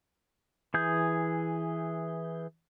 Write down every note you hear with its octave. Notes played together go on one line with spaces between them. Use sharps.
E3 G#4 G6